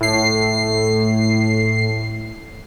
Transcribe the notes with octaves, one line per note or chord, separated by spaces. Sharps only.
A2 C7